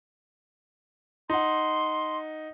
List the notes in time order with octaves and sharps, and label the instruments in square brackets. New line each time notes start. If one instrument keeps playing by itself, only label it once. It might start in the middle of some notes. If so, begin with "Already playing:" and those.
[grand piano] D#4 F#5 [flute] C6